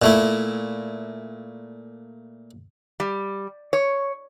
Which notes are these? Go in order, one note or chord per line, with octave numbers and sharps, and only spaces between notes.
A#2 A3 E4
G3
C#5